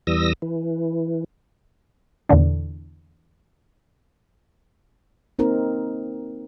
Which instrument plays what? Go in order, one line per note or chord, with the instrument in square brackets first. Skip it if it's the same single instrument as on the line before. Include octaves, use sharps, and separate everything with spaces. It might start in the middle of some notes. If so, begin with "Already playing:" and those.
[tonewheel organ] E2 E3 G3 D#6 E6 A#6
E3
[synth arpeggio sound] E2 A#2 D3 D4
[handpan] A#3 C4 D#4 A#4